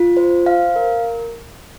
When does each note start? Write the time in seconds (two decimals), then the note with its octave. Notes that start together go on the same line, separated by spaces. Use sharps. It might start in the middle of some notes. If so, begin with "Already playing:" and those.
Already playing: F4
0.17 C5
0.46 F5
0.76 A#4